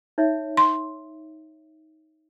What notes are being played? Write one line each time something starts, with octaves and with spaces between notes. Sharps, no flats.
D#4 C#5 E5
C6